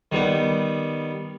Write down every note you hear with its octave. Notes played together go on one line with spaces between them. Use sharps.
D#3 G3 B3